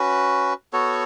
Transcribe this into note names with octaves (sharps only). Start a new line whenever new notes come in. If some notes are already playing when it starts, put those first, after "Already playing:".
Already playing: C#4 F#4 B4
B3 F#4 A4 C#5